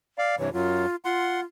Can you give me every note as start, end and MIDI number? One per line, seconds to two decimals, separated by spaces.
0.18 0.36 74
0.18 0.36 77
0.39 0.49 43
0.39 0.49 48
0.39 0.49 52
0.39 0.53 73
0.53 0.86 42
0.53 0.86 54
0.53 0.96 65
1.05 1.44 65
1.05 1.41 78
1.05 1.41 84